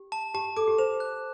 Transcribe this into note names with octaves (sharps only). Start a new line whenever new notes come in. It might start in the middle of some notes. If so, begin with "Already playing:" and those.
Already playing: G4
A5
G4 A5
A4 D6
G4
C5 E7
F#6